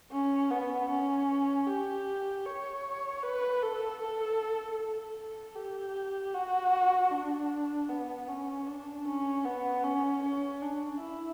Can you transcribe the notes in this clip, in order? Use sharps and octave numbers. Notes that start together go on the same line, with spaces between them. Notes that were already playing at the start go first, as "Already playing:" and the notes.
C#4
B3
C#4
G4
C#5
B4
A4
A4
A4
G4
F#4
D4
B3
C#4
D4
C#4
B3
C#4
C#4
D4
E4